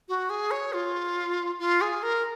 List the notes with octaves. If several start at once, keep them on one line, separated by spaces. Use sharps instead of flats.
F#4
G#4
C#5
F4
F4
G#4
A#4